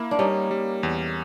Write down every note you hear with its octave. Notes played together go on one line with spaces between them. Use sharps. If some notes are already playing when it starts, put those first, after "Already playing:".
Already playing: A#3 E4
D4
G3 C#4 D#4
G3
E2